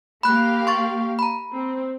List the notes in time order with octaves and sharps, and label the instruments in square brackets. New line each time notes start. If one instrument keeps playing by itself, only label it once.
[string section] A#3 G4 F5 [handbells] B5 F#6
[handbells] C6 C#6 A6
A#5 B5
[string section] C4